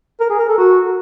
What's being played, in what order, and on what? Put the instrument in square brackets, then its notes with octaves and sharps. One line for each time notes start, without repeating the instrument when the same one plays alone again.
[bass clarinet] A#4
G#4
A#4
A4
F#4